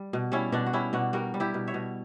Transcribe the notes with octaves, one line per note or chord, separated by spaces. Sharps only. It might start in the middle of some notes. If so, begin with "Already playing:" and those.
Already playing: G3
B2
G3 C#4 E4
B2 D4 F#4
F#4
G3 C#4 E4
B2 D4 F#4
G3 F#4 A#4
G3
E4 G4
B2
C#5 E5
B2